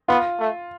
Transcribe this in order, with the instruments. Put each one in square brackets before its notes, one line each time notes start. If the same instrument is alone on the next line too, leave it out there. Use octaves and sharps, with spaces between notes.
[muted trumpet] B3 [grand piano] F4
[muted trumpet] A3